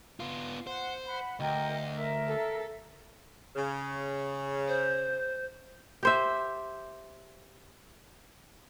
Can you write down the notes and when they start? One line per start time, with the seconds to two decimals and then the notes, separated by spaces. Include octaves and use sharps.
0.20 B3 F4
0.67 C5 F#5
1.06 F#5 B5
1.40 D2 A#4 D#5 G5
1.94 A#4 E5
2.28 A4
3.56 C#3
4.67 C5
6.03 G4 C5 E5